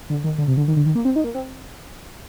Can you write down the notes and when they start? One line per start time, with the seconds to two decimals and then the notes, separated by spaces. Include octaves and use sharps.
0.10 D3
0.24 D#3
0.38 D3
0.48 C3
0.57 D3
0.68 D#3
0.76 D3
0.86 D#3
0.95 A#3
1.05 C4
1.16 D#4
1.24 A#3
1.35 C4